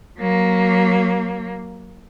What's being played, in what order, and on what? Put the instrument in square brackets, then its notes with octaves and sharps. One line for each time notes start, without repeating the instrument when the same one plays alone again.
[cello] F#3 A#3